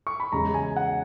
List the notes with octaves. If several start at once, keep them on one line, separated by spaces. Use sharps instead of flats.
C#6
B5
E2 C#3 G#3 C#4 A#5
G#5
F#5